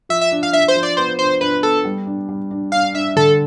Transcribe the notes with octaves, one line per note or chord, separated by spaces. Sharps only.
F3 E5
E5
D4
F5
D4 E5
C5
F3
D5
B3 C5
D4 C5
D4 B4
B3 A4
G3
D4
G3
D4
D4 F5
D4 E5
D3 A4